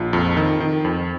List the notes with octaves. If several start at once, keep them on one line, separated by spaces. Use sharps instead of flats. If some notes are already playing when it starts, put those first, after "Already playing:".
Already playing: A#1 F4
F2
D#3
D#3
F2